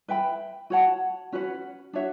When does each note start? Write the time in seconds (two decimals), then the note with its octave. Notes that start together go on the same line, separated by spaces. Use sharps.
0.08 B4 E5 G5 B5
0.70 F#4 C#5 F#5 A5
1.32 C#4 F#4 B4 F#5
1.93 D4 F#4 C#5 E5